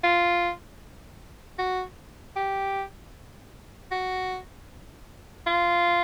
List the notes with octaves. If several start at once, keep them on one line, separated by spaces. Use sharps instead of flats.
F4
F#4
G4
F#4
F4